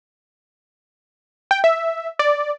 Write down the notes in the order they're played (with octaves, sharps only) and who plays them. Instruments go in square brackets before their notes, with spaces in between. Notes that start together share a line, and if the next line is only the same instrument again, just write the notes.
[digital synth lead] G5
E5
D5